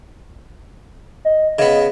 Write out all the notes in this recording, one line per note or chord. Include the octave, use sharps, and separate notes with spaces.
D#5
C#3 B3 D#5